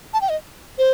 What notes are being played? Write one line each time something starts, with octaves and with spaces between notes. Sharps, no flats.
A5
G5
D#5
C5